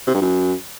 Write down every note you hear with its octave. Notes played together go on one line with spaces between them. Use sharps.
C3
G2
F#2